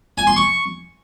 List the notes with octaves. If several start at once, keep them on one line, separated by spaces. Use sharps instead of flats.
G#5
C6
C#6